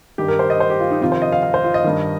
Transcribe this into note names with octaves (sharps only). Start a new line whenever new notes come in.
G2 D#3 G4
A#4
C5
D#5
C5
G4
F4
D#4
F2 C3 D#3 F4
C5
D#5
F5
F5
C5
F4
D#5
G2 D#3